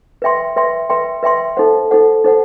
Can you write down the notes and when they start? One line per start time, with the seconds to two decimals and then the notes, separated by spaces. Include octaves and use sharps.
0.22 B4 E5 G5 C6
0.56 B4 E5 G5 C6
0.90 B4 E5 G5 C6
1.23 B4 E5 G5 C6
1.57 D#4 A4 C5 F#5
1.91 D#4 A4 C5 F#5
2.24 D#4 A4 C5 F#5